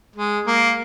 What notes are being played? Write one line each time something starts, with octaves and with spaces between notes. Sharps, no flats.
G#3
A#3